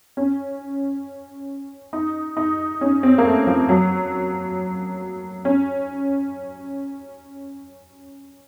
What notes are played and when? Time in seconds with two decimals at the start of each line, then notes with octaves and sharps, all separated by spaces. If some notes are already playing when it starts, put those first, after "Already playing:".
0.17 C#4
1.93 D#4
2.37 D#4
2.81 C#4
3.03 C4
3.18 A#3
3.25 A3
3.47 F3
3.69 F#3
5.45 C#4